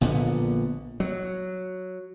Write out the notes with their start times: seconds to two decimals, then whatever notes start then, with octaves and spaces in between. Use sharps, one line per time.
0.01 A#1 A#2 D3 B3
1.00 F#3